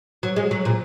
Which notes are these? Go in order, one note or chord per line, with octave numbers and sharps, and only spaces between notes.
F#3
G#3
F#3
A#2